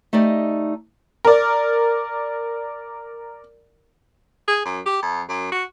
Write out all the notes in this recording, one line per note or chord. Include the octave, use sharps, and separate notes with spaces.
A3 D#4 G4 D5 D#5
A#4 D5
G#4
F#2
G4
F2
F#2
F#4